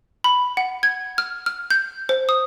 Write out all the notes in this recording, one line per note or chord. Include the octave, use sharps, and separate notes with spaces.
B5
F#5
G#6
F6
F6
G6
C5
D#6